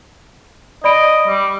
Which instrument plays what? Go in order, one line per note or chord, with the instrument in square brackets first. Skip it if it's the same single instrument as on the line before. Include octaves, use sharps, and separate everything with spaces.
[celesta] D5 B5 D7 [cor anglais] D#5
[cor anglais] G3